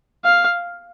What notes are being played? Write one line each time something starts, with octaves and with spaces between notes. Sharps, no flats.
F5